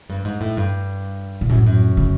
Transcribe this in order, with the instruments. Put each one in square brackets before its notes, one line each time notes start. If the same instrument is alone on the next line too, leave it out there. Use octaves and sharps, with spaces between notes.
[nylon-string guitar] G2
G#2
A2
G2
[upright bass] A#2
[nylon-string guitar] F#2 [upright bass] A2
[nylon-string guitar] F#2
[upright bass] C#3